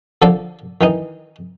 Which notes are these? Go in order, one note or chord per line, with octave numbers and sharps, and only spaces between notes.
D3 F3 A4 D5
D#3 E3 D#4